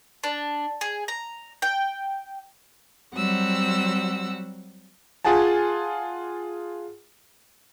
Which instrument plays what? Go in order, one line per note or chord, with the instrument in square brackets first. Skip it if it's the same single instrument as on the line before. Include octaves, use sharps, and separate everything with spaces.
[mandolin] D4
G#4
A#5
G5
[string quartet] F#3 G3 C4 F#5 E6
[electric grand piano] F4 G#4 F#5 G#5 A5